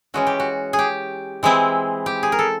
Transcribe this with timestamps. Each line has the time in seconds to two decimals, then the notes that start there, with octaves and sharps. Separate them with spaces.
0.14 E3 G#3 C#4 F#4
0.27 G4
0.40 F#4
0.73 G#4
0.79 G4
1.43 E3 G#3 C4 E4
2.06 G4
2.23 G#4
2.32 A#4
2.39 A4